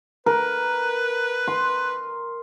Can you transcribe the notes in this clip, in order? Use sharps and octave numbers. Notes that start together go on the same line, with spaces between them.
A#4 B4
C6